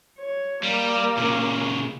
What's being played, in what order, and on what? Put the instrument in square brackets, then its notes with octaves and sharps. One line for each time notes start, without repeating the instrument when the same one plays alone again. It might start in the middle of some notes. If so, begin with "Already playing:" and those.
[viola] C#5
[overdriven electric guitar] G3 [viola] A#3
[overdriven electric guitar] A#2 C#3